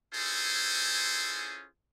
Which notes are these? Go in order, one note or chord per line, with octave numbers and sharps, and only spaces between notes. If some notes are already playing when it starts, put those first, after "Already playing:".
C#4 E4 F4 G#4 A4 C5